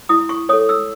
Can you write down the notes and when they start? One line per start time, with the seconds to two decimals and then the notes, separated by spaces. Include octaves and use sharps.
0.09 E4 D#6
0.29 C#6
0.49 A4 C#5 D#6
0.69 E6